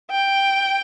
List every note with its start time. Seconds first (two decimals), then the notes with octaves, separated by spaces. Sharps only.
0.11 G5